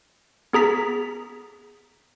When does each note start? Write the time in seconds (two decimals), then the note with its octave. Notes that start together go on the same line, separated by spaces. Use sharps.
0.53 B3 G#4 A#5 B6